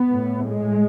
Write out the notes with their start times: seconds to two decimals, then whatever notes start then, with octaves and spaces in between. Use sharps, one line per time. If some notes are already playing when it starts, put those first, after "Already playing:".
Already playing: B3
0.10 A2
0.45 G#3